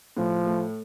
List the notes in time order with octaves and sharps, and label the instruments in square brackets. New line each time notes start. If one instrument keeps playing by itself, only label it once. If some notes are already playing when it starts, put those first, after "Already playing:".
[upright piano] A2 [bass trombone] F3
[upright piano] A3